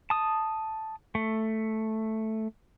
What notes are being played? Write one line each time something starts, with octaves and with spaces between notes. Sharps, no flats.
A5 D#6
A3